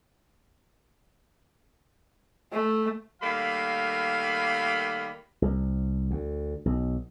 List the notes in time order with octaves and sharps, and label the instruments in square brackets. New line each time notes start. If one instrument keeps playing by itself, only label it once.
[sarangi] A3
[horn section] D#3 G3 A3 A#3 F5 B5
[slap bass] C2
D2
B1